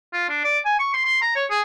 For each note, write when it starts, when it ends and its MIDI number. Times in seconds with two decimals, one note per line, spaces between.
0.13 0.27 65
0.29 0.44 62
0.44 0.59 74
0.65 0.77 80
0.80 0.89 85
0.94 1.05 84
1.05 1.21 84
1.22 1.32 82
1.36 1.45 73
1.50 1.62 68